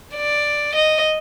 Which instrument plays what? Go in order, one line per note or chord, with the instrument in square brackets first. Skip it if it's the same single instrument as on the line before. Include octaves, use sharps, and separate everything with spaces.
[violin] D5
D#5